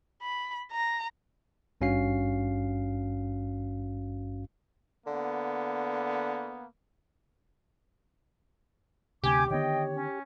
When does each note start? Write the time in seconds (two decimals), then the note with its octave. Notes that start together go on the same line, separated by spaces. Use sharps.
0.22 B5
0.72 A#5
1.81 G#1 G2 C#4 F#4 F5 C7
5.07 D3 A#3 B3
9.24 D2 C3 G4 G#5 D6
9.51 D3 D#3 B3 C#5 D#5 G5
9.96 C#4